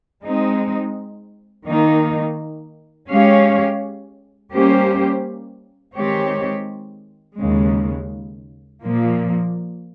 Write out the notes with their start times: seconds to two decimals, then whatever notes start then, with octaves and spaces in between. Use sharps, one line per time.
0.24 G#3 C4 D#4
1.67 D#3 A#3 D#4
3.10 G#3 C#4 G4 C#5 F5
4.52 G3 A#3 C#4 G4 C5
5.95 D#3 G#3 C4 G4 C#5
7.38 D#2 C#3 G#3
8.82 A#2 F3 A#3